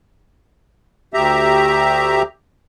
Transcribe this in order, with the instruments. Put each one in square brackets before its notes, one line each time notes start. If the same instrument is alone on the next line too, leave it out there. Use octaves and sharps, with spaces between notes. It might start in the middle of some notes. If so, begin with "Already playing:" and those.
[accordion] D2 G4 E5 A#5